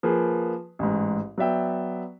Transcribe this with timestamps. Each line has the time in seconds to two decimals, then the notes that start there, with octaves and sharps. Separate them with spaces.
0.03 F3 A#3 G#4 B4
0.79 A1 G#2
1.38 F#3 B3 D5 E5 G5